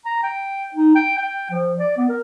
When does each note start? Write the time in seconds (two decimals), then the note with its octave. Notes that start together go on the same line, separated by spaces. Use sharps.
0.05 A#5
0.23 G5
0.74 D#4
0.95 G5
1.17 G5
1.51 F3
1.78 D5
1.97 B3
2.09 A#4